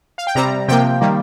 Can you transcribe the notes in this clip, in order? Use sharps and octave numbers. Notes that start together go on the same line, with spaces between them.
F5
G5
C3 G3 C4 A#5
C3 F3 A#3 G5
D#3 G3 A#3